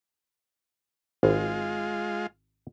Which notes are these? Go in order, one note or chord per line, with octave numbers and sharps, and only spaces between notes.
G#1 G#3 F4